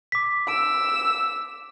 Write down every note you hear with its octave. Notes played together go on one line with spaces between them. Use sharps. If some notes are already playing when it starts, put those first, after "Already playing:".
D6 B6
E6 D7